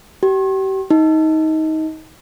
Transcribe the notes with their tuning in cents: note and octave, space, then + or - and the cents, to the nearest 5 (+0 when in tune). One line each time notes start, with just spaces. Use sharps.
G4 -35
D#4 +20